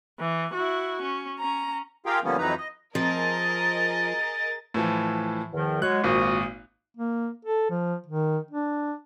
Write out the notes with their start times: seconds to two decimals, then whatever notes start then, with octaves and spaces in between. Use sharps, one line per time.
0.20 E3
0.54 E4 F#4
1.02 C#4
1.39 C#4 A#5
2.06 F4 G4 G#4 A#4 F5 G5
2.24 D3 F3 G3 A#3 B3 C#4
2.38 F2 E3 F#3 D#4 B4 A#5
2.58 D#5
2.95 F3 C4 G#4 A#4 D#5 A6
4.74 A2 E3 F3
5.53 E2 D#3 F3
5.82 F#3 G#3 C#5 F#6
6.04 G#1 A#2 F3 F#4 D#6
6.97 A#3
7.45 A4
7.70 F3
8.06 D#3
8.51 D4